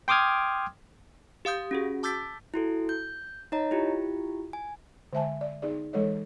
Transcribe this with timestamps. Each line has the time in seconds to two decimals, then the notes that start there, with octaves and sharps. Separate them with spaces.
0.08 G5 C6 D6 D#6 F6 G#6
1.45 G4 F5 D#6 G6
1.71 C#4 F#4 G#4
2.03 A5 D6 E6 G6 A6 B6
2.54 E4 F#4 A4
2.89 G6
3.52 D#4 C#5 D#5 A#5
3.71 E4 F4 G4
4.53 G#5
5.13 D3 G#3 C5 E5 G#5 A5
5.41 D5
5.62 B3 D#4 G#4 D5
5.93 E3 G#3 A4 C#5 D#5